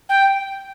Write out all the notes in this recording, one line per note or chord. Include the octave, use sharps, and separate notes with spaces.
G5